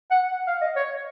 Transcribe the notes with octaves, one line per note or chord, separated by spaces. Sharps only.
F#5
F5
D#5
C#5